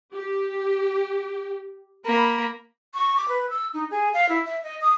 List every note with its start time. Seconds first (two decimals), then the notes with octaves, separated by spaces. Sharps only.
0.13 G4
2.06 A#3 B5
2.94 C#6
3.16 D6
3.28 B4
3.49 E6
3.73 D#4
3.90 G#4
4.13 F5
4.28 E4
4.45 E5
4.63 D#5
4.81 D#6